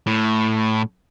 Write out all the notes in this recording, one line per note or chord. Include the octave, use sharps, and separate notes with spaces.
A2